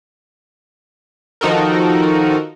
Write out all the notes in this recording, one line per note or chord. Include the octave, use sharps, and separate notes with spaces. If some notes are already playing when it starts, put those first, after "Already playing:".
D#3 F3 D#4 F#4 A4 A#4